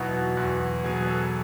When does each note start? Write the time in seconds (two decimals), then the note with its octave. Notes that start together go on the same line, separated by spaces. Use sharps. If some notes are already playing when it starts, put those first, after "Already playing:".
Already playing: E2 B2 F#3 B3 D#4 E4 F#4
0.13 F#4
0.37 E2 F#4
0.60 F#4
0.84 B2 F#3 B3 G#4
1.03 B4
1.08 A4